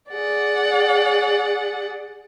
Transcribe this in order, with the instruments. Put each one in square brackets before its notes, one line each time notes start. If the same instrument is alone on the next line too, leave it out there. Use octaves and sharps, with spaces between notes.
[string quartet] G#4 D5 F#5